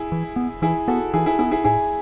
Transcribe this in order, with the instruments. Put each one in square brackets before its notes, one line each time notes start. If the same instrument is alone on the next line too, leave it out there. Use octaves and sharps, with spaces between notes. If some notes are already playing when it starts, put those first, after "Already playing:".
Already playing: [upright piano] E4 G#4
[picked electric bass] E3
B3
[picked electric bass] E3 [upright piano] E4 G#4
[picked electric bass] B3 [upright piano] F#4 A4
[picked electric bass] E3 [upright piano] E4 G#4
[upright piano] E4 G#4
[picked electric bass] B3 [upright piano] E4 G#4
[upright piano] E4 G#4
[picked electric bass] A2 [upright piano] E4 G#4